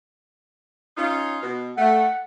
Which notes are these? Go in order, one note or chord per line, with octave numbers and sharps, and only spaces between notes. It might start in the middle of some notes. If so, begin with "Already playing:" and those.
C#4 D#4 F4
B2
A3 F#5